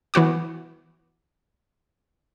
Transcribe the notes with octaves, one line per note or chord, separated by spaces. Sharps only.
E3 B3 F#4 D6